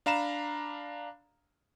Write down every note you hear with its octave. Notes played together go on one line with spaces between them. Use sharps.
D4 F5 A#5 B5 E7